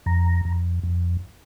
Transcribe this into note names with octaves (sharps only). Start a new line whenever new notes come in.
F2 A#5
F2
F2